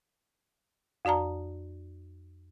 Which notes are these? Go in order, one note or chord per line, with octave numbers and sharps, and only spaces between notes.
F2 F#4 D5 A5 A#5